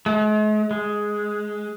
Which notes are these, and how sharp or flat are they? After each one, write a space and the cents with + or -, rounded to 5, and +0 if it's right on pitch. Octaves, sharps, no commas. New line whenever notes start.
G#3 +45
G#3 +5